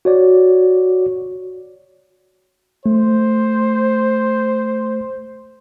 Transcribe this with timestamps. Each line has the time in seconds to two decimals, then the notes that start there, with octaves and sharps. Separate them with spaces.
0.05 F#4 C#5 D5
2.86 A3 C5